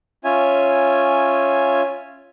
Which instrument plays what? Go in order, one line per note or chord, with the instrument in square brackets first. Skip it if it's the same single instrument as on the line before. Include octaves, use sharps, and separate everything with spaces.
[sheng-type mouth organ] C#4 F4 C#5 E5 G#5